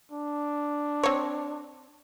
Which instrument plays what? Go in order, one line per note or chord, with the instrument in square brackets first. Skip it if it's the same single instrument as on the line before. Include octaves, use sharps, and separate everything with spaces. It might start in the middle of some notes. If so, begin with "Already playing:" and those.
[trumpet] D4
[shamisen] C4 C#5